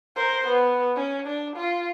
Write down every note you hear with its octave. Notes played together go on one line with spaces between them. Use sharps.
A#4 C5
B3
C#4
D4
F4